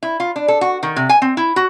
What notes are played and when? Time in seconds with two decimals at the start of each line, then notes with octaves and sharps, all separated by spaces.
0.03 E4
0.20 F4
0.36 D4
0.48 A4
0.61 F#4
0.83 D#3
0.96 C3
1.09 G#5
1.22 C4
1.37 E4
1.56 F#4